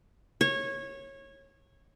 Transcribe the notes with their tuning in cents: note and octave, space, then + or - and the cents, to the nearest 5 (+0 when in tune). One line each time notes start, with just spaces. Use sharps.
C#5 -20